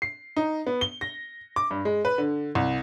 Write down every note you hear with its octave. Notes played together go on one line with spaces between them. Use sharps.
C7
D#4
B3
G7
A#6
D6
G2
G#3
B4
D3
C2